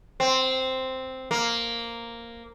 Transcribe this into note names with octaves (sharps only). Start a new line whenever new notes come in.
C4
A#3